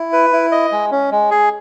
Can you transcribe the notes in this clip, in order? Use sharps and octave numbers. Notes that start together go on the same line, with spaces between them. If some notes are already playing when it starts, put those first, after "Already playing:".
Already playing: E4
B4
E4
D#5
G#3
C#4
G#3
G#4